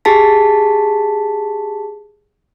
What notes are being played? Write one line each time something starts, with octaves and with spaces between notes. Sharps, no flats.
G4 G#4 A5 B6